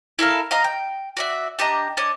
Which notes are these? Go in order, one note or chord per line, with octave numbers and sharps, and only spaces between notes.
E4 A4 A#4 F5
D#5 F5 A#5 D#6
G5
F#4 D5 E5
D4 G4 D#5 A#5
D4 C#5 D#5